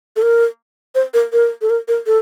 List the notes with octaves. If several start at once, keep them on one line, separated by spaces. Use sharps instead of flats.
A4
A#4
C5
A#4
A#4
A4
A#4
A#4
A4